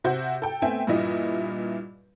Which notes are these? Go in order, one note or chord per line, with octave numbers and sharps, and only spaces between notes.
C3 F#4 C5 G6
A4 G5
A3 B3 C4 E5 G5 G#5
G2 A#2 E3 E4 D#5 E5